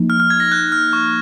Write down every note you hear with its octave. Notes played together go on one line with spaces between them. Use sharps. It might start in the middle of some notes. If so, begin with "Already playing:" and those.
Already playing: F3 A#3 D#4
F6
F6
G#6
A#6
F#6
F6
C#6